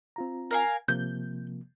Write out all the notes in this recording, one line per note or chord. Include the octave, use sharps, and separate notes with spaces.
C4 F4 A#5
A#4 F5 G#5
C3 F3 A#3 G6